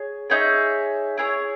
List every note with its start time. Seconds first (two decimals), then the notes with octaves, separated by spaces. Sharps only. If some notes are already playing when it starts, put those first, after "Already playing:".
Already playing: G#4 C#5
0.30 D#4 G#4 C#5 E5
1.18 E4 G#4 C#5